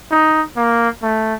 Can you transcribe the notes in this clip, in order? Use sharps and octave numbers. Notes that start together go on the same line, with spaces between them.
D#4
A#3
A3